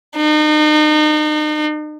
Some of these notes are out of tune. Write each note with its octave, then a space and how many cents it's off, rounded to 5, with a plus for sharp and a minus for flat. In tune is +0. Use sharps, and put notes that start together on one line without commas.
D#4 -40